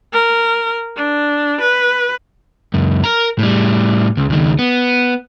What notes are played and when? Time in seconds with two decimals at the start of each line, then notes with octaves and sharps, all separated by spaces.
0.13 A#4
0.97 D4
1.61 B4
2.74 C#2 F#2
3.04 A#4 A#5
3.39 A2 G3
4.17 C#2
4.30 C#2 D#3
4.59 B3